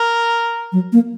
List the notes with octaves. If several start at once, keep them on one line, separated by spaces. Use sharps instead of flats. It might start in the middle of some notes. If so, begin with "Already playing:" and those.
Already playing: A#4
F#3
A#3